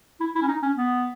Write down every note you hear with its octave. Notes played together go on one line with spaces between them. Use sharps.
E4
E4
C#4
D#4
C#4
B3